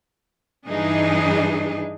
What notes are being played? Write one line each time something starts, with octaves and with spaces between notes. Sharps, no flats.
G2 E3 D4 D#4 G#4 D#5